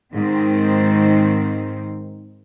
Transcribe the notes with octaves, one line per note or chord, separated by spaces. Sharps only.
G#2 D#3 C4